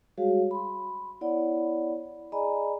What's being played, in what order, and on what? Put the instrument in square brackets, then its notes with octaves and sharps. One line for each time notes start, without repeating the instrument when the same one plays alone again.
[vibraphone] G3 G#3 F#4 G#4 C#5 F5
B5 C6
B3 E4 C#5 D5 F#5 B5
G#4 D5 D#5 G#5 A#5 B5